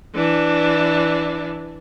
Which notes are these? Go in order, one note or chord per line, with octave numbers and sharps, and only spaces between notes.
E3 D4